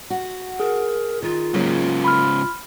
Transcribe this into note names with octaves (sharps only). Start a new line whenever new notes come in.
F#4
G#4 A#4
D#3 F4
G#2 C#3 F#3 A#3
B5 C6 F6